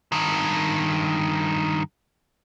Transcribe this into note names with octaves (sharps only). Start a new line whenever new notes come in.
G2 D#3